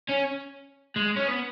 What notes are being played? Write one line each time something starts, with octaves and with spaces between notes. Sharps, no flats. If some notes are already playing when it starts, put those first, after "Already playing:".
C#4
G#3
C#4
B3